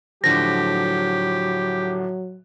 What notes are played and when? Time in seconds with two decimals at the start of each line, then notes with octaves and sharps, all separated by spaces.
0.24 A2 D3 F3 F#3 G4 A#6